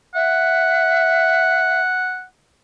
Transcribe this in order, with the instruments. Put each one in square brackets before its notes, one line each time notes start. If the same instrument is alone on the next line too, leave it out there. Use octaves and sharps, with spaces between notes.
[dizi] E5 [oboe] F#5